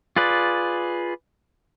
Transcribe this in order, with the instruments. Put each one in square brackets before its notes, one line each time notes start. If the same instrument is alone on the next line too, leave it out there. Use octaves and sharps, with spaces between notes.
[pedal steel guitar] F4 G#4 B4 D5